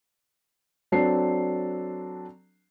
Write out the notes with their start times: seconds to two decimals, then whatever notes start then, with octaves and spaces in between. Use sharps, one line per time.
0.92 F#3 C4 D4 A4 C7